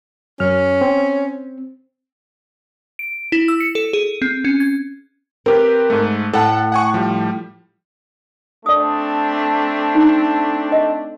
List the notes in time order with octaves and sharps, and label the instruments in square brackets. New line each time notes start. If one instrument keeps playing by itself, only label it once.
[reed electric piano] F#2 F6 [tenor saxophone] C#4
[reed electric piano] C4
[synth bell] D7
E4
E6
C#7
A4
G#4
C4
C#4
G#6
[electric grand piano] C4 G4 B4 [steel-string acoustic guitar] A#4
[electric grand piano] G#2 A3
[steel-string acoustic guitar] A2 [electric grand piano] A4 F#5 A5
[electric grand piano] F#5 G#5 C#6
F3 G3
[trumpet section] A3 C4 D4 [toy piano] D5 D#6
[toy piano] D#4
D#5